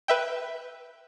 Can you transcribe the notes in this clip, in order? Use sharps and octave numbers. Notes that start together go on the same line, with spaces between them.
B4 E5 G5